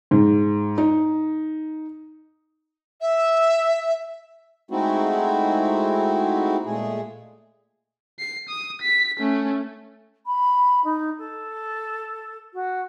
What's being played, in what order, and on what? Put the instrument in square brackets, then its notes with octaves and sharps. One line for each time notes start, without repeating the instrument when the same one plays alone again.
[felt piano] G#2
D#4
[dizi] E5
[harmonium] G#3 A3 C4 D#4 E4 F#4
A#2 G#3 A3 G#4
[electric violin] C7
D#6
B6
A3 C#4
[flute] B5
D#4
A4
F#4